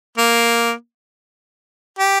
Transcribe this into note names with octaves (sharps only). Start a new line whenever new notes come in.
A#3
G4